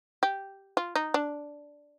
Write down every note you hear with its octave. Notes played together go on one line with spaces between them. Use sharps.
G4
F4
D#4
D4